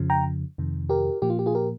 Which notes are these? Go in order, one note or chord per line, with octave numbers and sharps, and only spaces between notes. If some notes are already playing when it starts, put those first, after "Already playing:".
Already playing: F2 C#3 F3
G5 A#5
F2 C3 D#3
G4 A#4
A#2 F3 A#3 G4
F4
G4
F4 G#4
G4 A#4